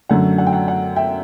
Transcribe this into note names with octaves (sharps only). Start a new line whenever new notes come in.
F#2 D3 F#3 A3 F#5
F#5
G5
F#5
F#5
E5 G5